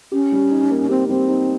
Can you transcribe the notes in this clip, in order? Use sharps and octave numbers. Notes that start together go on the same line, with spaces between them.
C#4 G4
G3
D#4
A#3
C4 G4
G3 C4
D#4